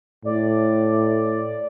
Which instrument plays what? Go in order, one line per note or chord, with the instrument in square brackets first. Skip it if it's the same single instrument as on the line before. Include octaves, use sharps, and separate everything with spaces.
[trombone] A2 [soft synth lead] D5